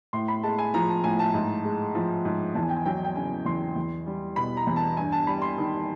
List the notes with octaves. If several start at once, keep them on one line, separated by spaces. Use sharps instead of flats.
A2 C6
B5
G#3 A5
G#5
F3 A#5
A5
A2 G#5
A5
G#2
G#3
F3
G#2
E2 A5
G#5
G5
G#5
F#3 G5
G5
C#3 G#5
E2 C6
E2
G3
B2 B5
A#5
E2
A5
G2 G#5
A5
G3 B5
C6
D#3